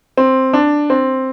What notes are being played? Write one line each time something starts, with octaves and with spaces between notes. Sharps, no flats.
C4
D4
C4